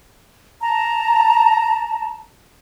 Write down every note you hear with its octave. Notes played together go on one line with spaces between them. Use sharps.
A5 A#5